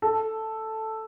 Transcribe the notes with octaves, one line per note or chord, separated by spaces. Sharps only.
A4